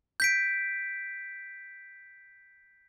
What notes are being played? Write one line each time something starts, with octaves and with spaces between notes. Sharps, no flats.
G6 B6 D7